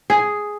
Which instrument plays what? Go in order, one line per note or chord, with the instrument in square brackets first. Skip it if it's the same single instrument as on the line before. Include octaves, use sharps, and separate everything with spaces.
[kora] G#4